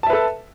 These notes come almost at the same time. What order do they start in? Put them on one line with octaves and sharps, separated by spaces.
A5 E5 B4 A4